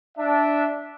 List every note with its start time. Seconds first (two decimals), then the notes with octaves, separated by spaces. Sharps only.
0.18 D4 E5